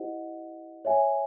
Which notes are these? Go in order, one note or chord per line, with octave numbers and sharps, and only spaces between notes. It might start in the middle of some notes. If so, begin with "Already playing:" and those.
Already playing: E4 G4 C5 D#5 F#5
C#5 E5 G#5